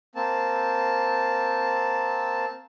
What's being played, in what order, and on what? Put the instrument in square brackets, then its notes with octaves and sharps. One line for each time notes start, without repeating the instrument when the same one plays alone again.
[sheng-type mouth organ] A#3 C4 A5